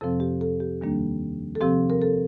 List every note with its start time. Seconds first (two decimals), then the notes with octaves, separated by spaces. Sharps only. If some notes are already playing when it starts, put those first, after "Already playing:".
0.01 F2 C3 F3 C4 A4
0.20 G4
0.41 A4
0.60 G4
0.81 D#2 D#3 G3 A#3 D4
1.55 A4
1.61 C3 F3 C4 G4
1.90 A#4
2.02 A4